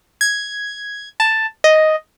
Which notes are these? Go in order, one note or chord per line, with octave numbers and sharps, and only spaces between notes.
G#6
A5
D#5